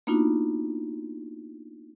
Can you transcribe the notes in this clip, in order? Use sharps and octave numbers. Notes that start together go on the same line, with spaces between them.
A#3 B3 D4 D#4 F4 F#4